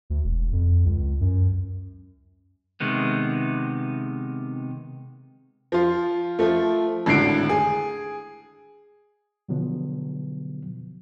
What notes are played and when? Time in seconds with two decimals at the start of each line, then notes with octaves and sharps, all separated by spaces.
0.10 D2
0.24 E1
0.52 F2
0.85 C#2
1.20 F#2
2.80 C3 D#3 G#3 B3
5.72 F3 F4
6.39 F3 A3
7.06 G#1 A2 D3 C7 D7
7.49 G#4
9.49 B2 D3 F3 F#3 B3